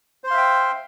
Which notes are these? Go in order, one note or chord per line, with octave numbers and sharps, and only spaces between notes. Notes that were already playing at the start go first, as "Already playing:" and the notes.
C5 E5 F5 G5 C6